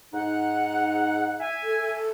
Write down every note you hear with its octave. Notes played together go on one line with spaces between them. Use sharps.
G#2 D#4 F#5
E5 G#5
A4